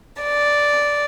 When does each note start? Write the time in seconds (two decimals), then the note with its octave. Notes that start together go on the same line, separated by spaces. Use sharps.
0.22 D5